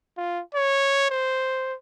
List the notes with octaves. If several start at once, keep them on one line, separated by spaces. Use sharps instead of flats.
F4
C#5
C5